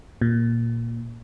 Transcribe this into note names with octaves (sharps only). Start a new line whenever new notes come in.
A#2